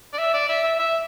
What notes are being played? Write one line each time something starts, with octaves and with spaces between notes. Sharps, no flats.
D5
E5
D5
E5
E5
E5